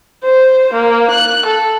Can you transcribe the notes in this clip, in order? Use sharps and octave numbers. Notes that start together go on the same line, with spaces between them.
C5
A#3
F#6
A4